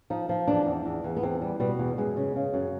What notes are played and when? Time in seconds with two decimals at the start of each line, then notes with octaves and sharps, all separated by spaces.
0.10 F3 D#4
0.29 F3
0.47 E2 D4
0.66 E2
0.85 E2
1.04 E2
1.17 B3
1.23 E2 C4
1.42 G3
1.60 B2 G3
1.79 E2
1.97 F#2 G#3
2.17 C#3
2.36 C#3
2.54 F#2